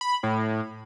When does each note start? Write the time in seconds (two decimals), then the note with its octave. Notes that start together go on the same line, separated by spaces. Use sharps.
0.01 B5
0.23 A2